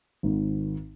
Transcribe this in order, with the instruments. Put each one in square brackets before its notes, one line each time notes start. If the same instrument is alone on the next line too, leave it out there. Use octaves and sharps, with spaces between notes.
[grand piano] G#1 G#2 D#3